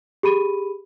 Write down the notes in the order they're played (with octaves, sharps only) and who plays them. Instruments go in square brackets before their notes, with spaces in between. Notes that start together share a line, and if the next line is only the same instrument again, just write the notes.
[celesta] G4 G#4 B5 D#7